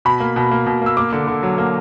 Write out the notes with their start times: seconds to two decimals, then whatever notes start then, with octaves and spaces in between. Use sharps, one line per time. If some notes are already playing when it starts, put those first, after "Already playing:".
0.05 B2 B5
0.20 A#3
0.36 B2
0.51 A#3
0.66 B2
0.82 A#3 E6
0.97 A#3 D6
1.12 D3
1.27 D3
1.43 F#3
1.58 A#3